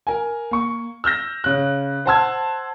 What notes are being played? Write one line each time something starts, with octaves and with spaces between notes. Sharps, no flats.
A#4 G#5
A#3 C#6
E6 F6 G6 A#6
C#3 F#6
C5 F#5 A5 C6 E6 G#6